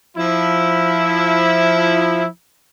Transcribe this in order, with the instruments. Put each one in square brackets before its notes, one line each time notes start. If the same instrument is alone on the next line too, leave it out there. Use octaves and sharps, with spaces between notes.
[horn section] F3 E4